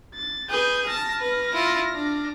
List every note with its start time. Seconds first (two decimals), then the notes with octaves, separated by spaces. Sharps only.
0.14 A6
0.50 G#4 B4 G6
0.88 A5 F6 A#6
1.19 B4
1.53 E4 F4
1.94 D4